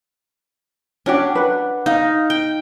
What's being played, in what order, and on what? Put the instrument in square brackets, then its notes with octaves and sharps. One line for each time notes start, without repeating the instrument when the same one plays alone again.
[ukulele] C#4 F#4 G4 [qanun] D4
[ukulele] B4 F#5
[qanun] D#4 [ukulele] F5
[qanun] G5